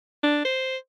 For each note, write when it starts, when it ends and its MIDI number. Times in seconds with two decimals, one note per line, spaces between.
0.23 0.40 62
0.45 0.77 72